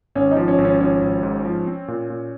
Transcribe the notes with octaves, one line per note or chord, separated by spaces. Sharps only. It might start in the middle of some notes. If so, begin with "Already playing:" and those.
G#1 C#4
D#4
F3
C#4
G#1
C#4
F3 C#4
G#1
G#2
F3
C4
A#2
A#2